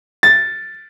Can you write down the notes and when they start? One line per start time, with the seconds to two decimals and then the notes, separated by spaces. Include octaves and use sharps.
0.23 A6